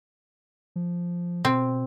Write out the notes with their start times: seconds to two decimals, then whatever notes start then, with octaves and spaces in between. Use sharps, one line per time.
0.76 F3
1.45 B2 C4